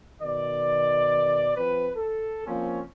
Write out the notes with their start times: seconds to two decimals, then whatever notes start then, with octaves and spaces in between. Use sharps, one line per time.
0.22 B2 D#3 D5
1.56 F3 C4 B4
1.96 A4
2.46 F3 A#3 C4 C#4